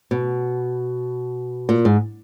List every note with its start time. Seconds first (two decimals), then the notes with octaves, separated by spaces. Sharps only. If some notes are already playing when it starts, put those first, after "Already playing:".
0.11 B2
1.69 A#2
1.85 G#2